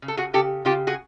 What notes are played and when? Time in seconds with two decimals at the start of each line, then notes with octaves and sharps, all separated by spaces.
0.02 C#3
0.08 A4
0.17 F#4 G#4
0.33 C#3 G4 A4
0.65 C#3 F4 G4
0.87 F#4 G#4